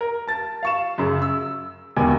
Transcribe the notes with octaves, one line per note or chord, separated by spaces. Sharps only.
A#4
A5 A6
F5 C#6 E7
F#2 C#3
E6
E1 D#2 B2 G#5